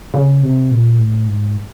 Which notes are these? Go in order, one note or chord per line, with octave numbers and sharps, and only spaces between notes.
C#3
C3
A#2
A2
G#2